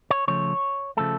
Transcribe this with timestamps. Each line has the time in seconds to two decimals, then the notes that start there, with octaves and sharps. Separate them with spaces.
0.11 C#5
0.28 C#3 F3 A3 C#5
0.97 C#3 F3 A3 A4